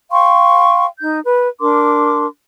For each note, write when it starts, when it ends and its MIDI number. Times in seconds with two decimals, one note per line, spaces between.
0.11 0.85 77
0.11 0.85 79
0.11 0.85 84
0.11 0.85 85
1.00 1.17 63
1.00 1.17 91
1.23 1.45 71
1.60 2.25 62
1.60 2.25 70
1.60 2.25 84
1.60 2.25 86